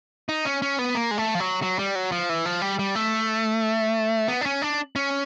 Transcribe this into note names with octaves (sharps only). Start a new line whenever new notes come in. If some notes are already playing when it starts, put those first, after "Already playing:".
D#4
C#4
C#4
B3
A#3
G#3
A3
F3
F#3
F#3
G3
F#3
F3
E3
F3
G3
G3
A3
B3
D4
C#4
D4
C#4